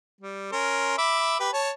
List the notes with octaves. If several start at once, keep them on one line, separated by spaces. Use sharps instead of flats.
G3
C#4 A#4 C6
E5 B5 D6
G4 B4
C#5 A5